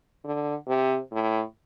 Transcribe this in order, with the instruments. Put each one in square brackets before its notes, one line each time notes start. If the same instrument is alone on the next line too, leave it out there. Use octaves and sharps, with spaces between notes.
[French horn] D3
C3
A2